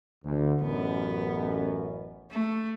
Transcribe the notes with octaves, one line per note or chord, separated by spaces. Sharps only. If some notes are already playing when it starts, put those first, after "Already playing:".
D2
A1 F#2 B3
A3